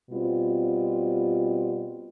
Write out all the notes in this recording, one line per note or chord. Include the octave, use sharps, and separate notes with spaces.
B2 G3 C4 F4